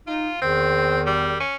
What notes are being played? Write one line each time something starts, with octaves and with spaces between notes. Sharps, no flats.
D#4 F4
E2 D#3 C4
G3
C#4